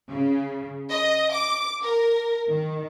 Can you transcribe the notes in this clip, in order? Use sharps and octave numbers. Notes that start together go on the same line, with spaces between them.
C#3
D#5
D6
A#4
D#3